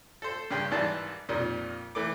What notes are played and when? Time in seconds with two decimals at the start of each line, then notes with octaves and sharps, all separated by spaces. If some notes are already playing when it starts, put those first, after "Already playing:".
0.22 A4 C5
0.51 G2 C#3 G5 C6
0.71 G#1 D#3 E3 G3 A5 C6
1.29 F2 A#2 D#3 G3
1.95 E3 A3 D6